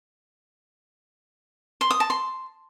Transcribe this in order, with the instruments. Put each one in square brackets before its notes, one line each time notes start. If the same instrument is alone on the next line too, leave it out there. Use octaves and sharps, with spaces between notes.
[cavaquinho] C6
D#6
A5
C6